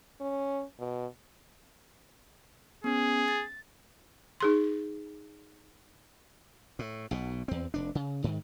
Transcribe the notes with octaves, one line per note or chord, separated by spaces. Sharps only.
C#4
B2
B3 C#4 G#4
A6
D#4 G#4 C6
A2
B1 B2
E2 C4
F1 D4
C#3
G#2 D#3